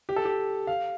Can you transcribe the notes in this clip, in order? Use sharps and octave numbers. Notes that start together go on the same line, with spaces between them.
G4
A4
G4
F5